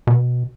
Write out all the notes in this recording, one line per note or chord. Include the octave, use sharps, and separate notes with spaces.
B2